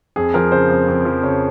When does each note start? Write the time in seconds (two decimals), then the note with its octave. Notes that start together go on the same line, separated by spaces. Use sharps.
0.16 F2 G#4
0.34 F3 A#4
0.52 C#3 C5
0.70 F2
0.88 F2
1.05 F3
1.23 C#3 C#5